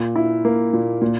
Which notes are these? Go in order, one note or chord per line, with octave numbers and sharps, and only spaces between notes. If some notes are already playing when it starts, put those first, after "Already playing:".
Already playing: A#2
E4
A#3
A#2
A#2